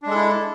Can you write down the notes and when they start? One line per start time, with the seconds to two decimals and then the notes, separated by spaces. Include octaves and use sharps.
0.02 D4
0.07 G#3
0.11 A4
0.15 E4